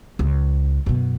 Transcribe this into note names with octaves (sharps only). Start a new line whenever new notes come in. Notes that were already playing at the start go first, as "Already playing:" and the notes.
C#2
F#2 B2